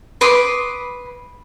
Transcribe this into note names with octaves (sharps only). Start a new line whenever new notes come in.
B4 C6 D6 D#6